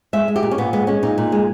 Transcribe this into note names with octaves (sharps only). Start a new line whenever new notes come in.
G#3 E5
G#3
G4
A#2
C#4
A#2 B3
G#3 B3
G#3 C#4
A#2 D#4
A#2
G#3